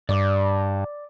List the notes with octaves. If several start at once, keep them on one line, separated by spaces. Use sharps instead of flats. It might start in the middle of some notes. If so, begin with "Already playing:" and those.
G2 D5 D6